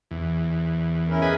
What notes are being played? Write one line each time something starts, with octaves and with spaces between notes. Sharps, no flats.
E2
C#4 E4 A#4
G#4 B4 D#5